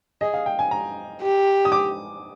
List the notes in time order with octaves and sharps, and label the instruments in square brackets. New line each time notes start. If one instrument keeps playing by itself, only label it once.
[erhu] G#4 [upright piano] D#5
[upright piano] F5
G5
G#5
A#5
[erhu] G4
[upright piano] D#6
D6